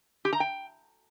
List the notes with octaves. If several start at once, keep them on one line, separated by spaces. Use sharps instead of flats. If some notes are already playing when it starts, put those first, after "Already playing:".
G4
A#5
G5